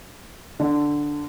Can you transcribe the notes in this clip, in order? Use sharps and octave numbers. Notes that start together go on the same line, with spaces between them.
D3